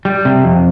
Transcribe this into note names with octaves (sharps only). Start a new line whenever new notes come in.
G3
C3
F2